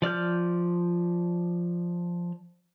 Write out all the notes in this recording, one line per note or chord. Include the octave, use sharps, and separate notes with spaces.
F3 D5 F6 G6